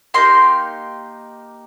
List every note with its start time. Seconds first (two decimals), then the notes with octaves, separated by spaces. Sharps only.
0.14 A#3 D#4 G4 C6